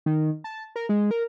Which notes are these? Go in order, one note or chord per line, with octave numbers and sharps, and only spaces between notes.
D#3
A5
A#4
G#3
A#4